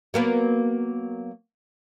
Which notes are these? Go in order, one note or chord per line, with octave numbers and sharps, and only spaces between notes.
F#3 A#3 B3